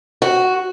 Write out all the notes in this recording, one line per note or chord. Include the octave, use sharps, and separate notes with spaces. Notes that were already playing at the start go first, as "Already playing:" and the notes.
F#4